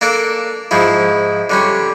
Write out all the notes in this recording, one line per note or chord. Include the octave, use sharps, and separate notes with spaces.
A#3 D4 A4 D5
G#2 F3 E4
D3 G3 C#4